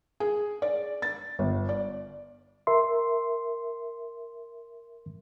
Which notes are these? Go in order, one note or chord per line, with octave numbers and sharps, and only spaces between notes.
G#4
D5
A6
G1
D5
A#4 E5 C6